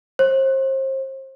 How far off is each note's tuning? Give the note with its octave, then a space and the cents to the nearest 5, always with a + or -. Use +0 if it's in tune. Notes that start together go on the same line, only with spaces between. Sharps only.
C5 +35